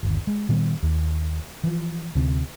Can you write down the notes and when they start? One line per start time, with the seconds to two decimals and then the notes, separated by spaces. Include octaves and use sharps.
0.03 G1 D#2
0.27 G#3
0.49 A#2 D#3 G3 B3
0.83 D#2
1.64 E3 F3
2.15 D2 C3